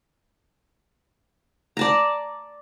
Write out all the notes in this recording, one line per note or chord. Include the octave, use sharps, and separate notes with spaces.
D5 A5 A#5